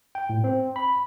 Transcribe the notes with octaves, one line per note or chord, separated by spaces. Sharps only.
G5
A2
C4
B5